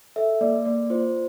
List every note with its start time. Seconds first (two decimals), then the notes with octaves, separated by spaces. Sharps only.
0.16 A4 E5
0.41 A#3 D5
0.65 A#3 D5
0.90 F4 C5